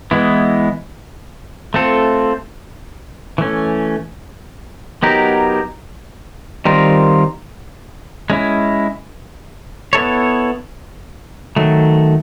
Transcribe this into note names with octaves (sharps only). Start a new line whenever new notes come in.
E3 G#3 B3 E4
A3 C4 F4 A4
E3 A3 C#4
F#3 B3 D#4 G4 A#4
D#3 G3 C4 F4 A#4
G#3 C#4 E4
B3 E4 A4 C#5
D#3 F#3 A3